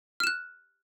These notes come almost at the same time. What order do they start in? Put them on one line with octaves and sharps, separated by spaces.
F6 E7 F#6